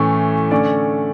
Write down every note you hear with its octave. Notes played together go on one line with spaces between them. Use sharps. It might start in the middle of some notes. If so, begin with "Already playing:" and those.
Already playing: A2 E3 A3 C#4
D3 A3 C#4 D5